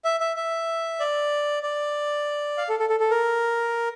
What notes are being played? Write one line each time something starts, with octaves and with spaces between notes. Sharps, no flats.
E5
E5
E5
D5
D5
F5
A4
A4
A4
A4
A#4